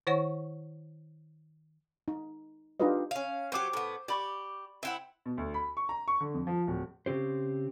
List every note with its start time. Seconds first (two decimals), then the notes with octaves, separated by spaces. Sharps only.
0.07 D#3 E4 C5 C#5 F#5 C#6
2.08 D#4
2.80 D4 D#4 F4 G4 B4 D#5
3.11 C#4 F5
3.52 F#3 G4 C5 D6
3.73 A2 B3
4.08 G4 D5 B5 C#6
4.83 C4 E4 E5 F#5 G5
5.26 B2
5.38 D2
5.54 B5
5.77 C#6
5.89 A#5
6.08 C#6
6.21 D3
6.34 F2
6.47 F3
6.67 D1
7.06 C#3 C4 G4 C5